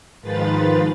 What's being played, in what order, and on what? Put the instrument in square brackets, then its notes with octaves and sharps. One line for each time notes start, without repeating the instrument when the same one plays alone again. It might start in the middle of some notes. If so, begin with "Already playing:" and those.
[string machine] G#2 D#3 F3 F4 B4 A6